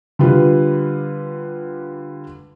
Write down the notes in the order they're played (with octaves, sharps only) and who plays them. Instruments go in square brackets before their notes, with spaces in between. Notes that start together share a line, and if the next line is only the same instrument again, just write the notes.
[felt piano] D3 G3 F4 B4